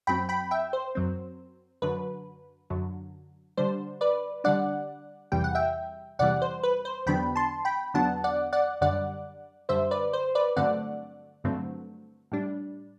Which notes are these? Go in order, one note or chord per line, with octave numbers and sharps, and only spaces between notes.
F#2 F#3 C4 G5 B5
G5 B5
E5 G5
C5
F#2 F#3 C4
F#2 D3 F#3 B4
F#2 D3 F#3
D3 G3 D4 C5
B4 D5
D3 G3 D4 D5 F#5
E2 C3 E3 G3 G5
F#5
E5 G5
E2 C3 E3 G3 D5 F#5
C5
B4
C5
E2 D3 F#3 B3 D4 G5 B5
A5 C6
G5 B5
E2 D3 F#3 B3 D4 F#5 A5
D5 F#5
D5 F#5
F#2 D3 G3 D5 F#5
F#2 D3 G3 C5 E5
B4 D5
C5
B4 D5
G2 D3 F#3 A3 C4 D5 F#5
G2 D3 F#3 A3 C4
A2 G3 D4